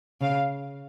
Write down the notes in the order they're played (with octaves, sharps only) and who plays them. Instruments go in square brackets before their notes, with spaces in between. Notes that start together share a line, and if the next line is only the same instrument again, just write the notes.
[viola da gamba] C#3 [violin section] F5